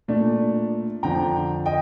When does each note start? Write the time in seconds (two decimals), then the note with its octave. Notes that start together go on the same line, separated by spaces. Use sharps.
0.08 A#2 A3 D4
1.03 F2 D3 F3 G5 A#5
1.66 D#5 G5